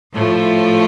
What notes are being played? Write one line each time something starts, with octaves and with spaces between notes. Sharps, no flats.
A2 F3 A3